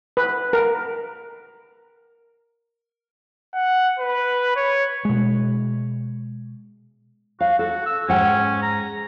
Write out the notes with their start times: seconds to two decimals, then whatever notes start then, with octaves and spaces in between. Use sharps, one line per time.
0.17 B4
0.53 A#4
3.54 F#5
3.99 B4
4.56 C#5
5.05 B2 G#3
7.40 F#4 F5
7.59 F#4 A4
7.86 E6
8.08 G#2 C#4 F#5 G5
8.62 A#5